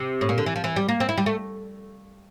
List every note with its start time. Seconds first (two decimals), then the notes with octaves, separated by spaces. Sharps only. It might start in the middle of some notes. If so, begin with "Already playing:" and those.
Already playing: C3
0.21 A2
0.29 A#2
0.38 D3
0.46 E3
0.56 F3
0.64 E3
0.76 G3
0.89 A#3
1.00 C4
1.09 E4
1.18 G3
1.26 A3